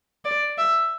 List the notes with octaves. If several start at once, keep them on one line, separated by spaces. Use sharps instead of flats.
D5
E5